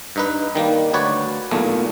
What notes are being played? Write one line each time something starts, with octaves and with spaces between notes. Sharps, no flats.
G2 D#4 B4
D#3 G3 A#3
D2 F#4 B4 C#5 D5
B1 E2 A#2 A3